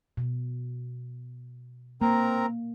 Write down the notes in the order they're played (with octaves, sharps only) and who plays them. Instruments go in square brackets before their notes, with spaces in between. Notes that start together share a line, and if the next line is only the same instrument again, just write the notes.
[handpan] B2
[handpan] A#3 [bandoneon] C4 A#4 A#5